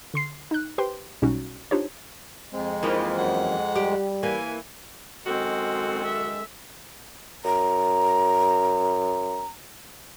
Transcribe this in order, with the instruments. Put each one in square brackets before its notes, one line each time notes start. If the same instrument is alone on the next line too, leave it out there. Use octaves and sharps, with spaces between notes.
[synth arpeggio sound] D3 C6 C7
D#4 F#6
G4 B4 C5 G5 C6
B1 B2 G3 C#4 D#4 F#4
D4 D#4 F4 G4 C5 C#5
[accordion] F2 G#3 [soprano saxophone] C4
[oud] E3 F3 A#3 [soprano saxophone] D#4
[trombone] F#2 [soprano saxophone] F#5
[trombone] G3 [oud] G4
[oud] E3 A#3 [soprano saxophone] G#5
[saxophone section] F#2 D#3 A4 [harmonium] G#3 [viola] C4 [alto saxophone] F#4
[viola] E5
[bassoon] F#2 [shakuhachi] A#5